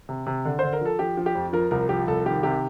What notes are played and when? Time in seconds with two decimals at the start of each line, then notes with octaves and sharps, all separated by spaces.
0.09 C3
0.26 C3
0.45 D3
0.59 D3 C5
0.73 A#4
0.81 F3 A4
0.99 F3 G4
1.17 F3
1.26 G4
1.35 F2
1.53 F3 A#4
1.71 C2 A#4
1.89 F3 G4
2.07 C2 A4
2.26 D#3 G4
2.43 C3 G4